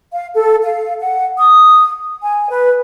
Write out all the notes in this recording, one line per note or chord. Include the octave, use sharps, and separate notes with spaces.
F5
A4
F5
F#5
D#6
G#5
B4